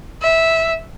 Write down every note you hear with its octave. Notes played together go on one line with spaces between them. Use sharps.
E5